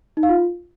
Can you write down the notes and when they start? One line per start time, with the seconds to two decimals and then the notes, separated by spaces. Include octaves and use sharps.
0.17 D#4
0.23 F5
0.29 F4